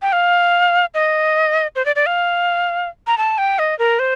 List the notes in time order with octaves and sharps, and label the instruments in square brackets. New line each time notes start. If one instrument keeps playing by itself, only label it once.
[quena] G5
F5
D#5
C5
D5
D5
F5
A#5
A5
G5
D#5
A#4
C5